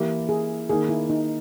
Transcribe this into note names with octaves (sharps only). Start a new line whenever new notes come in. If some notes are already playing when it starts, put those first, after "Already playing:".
Already playing: E3 A#3 E4 G4
G#4
D#3 A#3 D#4 G#4
E4
D#4